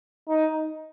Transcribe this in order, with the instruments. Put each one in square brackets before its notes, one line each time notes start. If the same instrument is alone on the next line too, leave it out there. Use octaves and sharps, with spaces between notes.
[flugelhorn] D#4